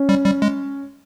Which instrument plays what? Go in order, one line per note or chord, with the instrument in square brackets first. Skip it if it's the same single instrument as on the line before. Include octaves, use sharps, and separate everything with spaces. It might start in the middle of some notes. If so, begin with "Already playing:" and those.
Already playing: [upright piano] C#4
[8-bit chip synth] G3
G3
G#3